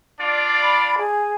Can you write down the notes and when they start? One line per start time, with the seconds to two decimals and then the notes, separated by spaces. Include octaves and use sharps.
0.20 D4 F4 D5
0.62 B5
0.98 G#4